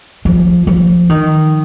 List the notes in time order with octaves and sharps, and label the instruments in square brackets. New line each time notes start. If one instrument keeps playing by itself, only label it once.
[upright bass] F3
F3
D#3